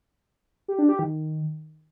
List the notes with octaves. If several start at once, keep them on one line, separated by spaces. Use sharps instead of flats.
G4
D4
G4
D#3